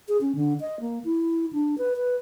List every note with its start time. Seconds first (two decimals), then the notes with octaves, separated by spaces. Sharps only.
0.08 G#4
0.21 C#4
0.35 D3
0.60 D#5
0.80 A#3
1.04 E4
1.53 D4
1.78 B4
1.97 B4